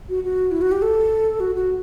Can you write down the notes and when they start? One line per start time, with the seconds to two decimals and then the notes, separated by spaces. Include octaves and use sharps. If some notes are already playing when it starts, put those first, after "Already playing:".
0.09 F#4
0.24 F#4
0.52 E4
0.62 F#4
0.72 G4
0.82 A4
1.40 F#4
1.55 F#4